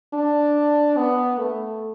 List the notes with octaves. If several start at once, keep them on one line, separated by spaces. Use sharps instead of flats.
D4
B3
A3